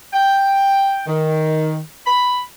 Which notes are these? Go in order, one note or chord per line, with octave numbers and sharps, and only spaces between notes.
G5
D#3
B5